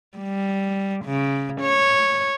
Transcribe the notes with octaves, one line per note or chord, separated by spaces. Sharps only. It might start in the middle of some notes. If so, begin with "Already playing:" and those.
G3
C#3
C#5